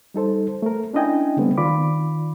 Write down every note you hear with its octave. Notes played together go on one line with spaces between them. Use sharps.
G3 D#4 A4 C5
A3 A#4
C#4 D4 E4 D#5 G5 G#5
C#3 G3 A3 B3 C4
D#3 F4 D5 B5 D6